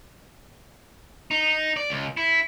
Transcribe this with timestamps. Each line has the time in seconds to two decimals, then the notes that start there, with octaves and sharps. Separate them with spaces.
1.31 D#4
1.77 D5
1.90 C#2
2.17 E4